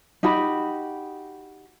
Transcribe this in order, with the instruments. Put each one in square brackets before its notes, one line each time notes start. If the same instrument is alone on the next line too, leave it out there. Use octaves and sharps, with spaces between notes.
[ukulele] D#4 F#4 G4 B5